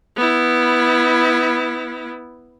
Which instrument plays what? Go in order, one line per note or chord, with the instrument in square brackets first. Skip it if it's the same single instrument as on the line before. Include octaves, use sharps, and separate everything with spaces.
[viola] B3 E4